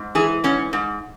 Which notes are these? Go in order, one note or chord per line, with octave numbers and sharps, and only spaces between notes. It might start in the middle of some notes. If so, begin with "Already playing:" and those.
Already playing: G#2
E3 G#4
G#2 C#4
G#2